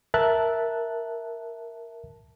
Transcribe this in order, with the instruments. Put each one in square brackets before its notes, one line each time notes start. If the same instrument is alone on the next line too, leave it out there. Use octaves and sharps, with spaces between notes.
[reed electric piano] A#4 E5 A5 F#6